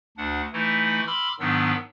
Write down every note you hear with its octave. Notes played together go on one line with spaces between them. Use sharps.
D2 D4 F#5
E3 A3 D#4 E4
B5 C6 D6 E6 F6
G#2 D#3 F#3 B3 D4 E6